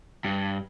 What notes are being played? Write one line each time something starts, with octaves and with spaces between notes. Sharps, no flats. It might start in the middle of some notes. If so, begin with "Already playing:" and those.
G2